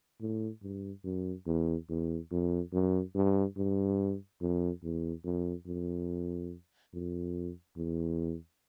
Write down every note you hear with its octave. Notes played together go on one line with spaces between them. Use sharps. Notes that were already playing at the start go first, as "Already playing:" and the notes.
A2
G2
F#2
E2
E2
F2
F#2
G2
G2
F2
E2
F2
F2
F2
E2